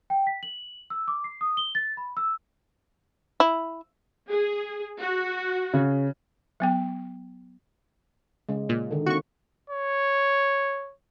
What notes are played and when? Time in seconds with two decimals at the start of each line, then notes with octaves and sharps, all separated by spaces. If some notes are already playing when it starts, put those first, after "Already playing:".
0.10 G5
0.27 B6
0.43 F#7
0.90 E6
1.08 D6
1.24 C7
1.41 D#6
1.57 G7
1.75 A6
1.97 B5
2.17 E6
3.40 E4
4.30 G#4
5.01 F#4
5.73 C#3
6.60 F#3 B3 G5
8.49 C#3 G#3
8.69 A#2
8.91 D3 D#3
9.06 A#3 C4 F#4 C#6
9.70 C#5